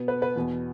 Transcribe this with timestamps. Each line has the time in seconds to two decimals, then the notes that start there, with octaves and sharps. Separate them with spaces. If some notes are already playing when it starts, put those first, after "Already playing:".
Already playing: B2 B3
0.08 B4
0.22 B4
0.36 E2 B2 B3